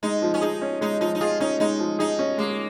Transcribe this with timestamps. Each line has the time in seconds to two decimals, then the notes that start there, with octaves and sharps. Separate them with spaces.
0.03 G#3 D#4
0.22 F3
0.34 C#4
0.41 D#4 G#4
0.62 C#4
0.81 G#3 D#4
1.00 F3 D#4
1.15 D#4
1.21 F4 G#4
1.40 C#4 D#4
1.60 G#3 D#4
1.79 F3
1.99 D#4 G#4
2.19 C#4
2.38 G#3 A#3